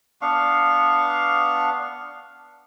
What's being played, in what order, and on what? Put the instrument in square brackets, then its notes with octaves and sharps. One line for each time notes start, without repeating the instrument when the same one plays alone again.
[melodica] B3 D4 F5 C#6